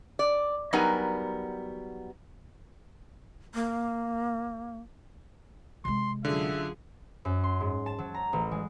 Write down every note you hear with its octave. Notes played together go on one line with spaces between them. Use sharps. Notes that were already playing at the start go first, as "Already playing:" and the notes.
D5
F#3 G3 B3 D#4 A#4 G#5
A#3
C3 G#3 C6
F#2 D3 F4 G#4 E5
F#2
C6
G#2
A5
F#3
A#5
A1
G#3